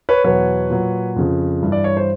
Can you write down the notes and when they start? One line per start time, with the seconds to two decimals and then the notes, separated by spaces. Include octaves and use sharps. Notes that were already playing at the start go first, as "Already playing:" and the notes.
0.09 B4 C#5
0.24 E2 B2 F#3 B4 C#5
0.70 A#2 F#3
1.16 F2 C#3 F3
1.63 G2 E3
1.72 D5
1.84 C#5
1.97 C5